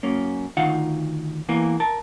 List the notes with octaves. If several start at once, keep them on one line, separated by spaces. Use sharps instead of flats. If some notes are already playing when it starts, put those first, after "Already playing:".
F#2 A#3 C#4
D2 D#3 D#4 F4 F5 F#5
E2 E3 A#3
A#4 A5